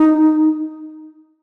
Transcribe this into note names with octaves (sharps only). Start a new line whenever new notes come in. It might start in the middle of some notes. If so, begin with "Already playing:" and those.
Already playing: D#4